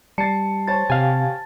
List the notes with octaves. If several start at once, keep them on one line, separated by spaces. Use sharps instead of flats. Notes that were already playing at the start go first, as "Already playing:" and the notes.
G3 A5 A6 C7 C#7
C5 C#5 A5 A6
C3 G4 F5 G#5